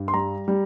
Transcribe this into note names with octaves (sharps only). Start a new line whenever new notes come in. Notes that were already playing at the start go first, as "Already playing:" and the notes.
Already playing: G2
C6
G3 A#5
G3